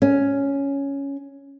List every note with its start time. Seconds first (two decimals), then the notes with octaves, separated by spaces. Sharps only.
0.02 C#4